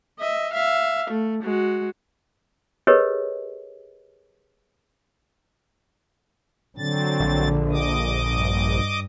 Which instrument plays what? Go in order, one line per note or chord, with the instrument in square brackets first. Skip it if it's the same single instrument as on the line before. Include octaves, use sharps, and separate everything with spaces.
[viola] D#5 E5
E5 F5
A3
G#3 F#4
[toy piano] G4 G#4 A#4 B4 C#5 D#5
[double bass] D3 [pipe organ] F#3 C4 A6
[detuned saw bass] A#1
[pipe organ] D#5 D6 D#6
[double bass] G2